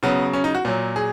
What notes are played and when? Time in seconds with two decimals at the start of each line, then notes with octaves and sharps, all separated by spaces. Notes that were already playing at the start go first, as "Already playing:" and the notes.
0.03 C#3 F#3 B3
0.33 C#4
0.44 D#4
0.55 F#4
0.65 A#2 F#3
0.96 G#4